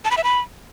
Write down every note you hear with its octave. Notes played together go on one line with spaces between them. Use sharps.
A5
B5
E5
B5